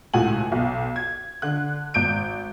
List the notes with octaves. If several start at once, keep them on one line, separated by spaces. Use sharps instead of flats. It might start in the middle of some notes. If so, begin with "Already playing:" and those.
C#2 A2 F#4 G#5 F#7
B1
G#6
D3 F#6
G#1 G6 D7